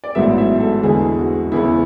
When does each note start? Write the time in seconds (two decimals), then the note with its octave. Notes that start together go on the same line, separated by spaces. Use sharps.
0.04 D5
0.15 A1 G#2 F#3 B3 E5
0.38 E5
0.60 A4
0.83 E2 D3 G#3 B3 G#4
1.18 F#4
1.52 E2 C#3 E3 B3 E4